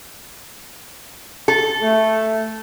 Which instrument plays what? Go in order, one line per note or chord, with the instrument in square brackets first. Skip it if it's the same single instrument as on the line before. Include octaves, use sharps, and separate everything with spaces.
[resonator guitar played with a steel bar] A4
[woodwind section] A3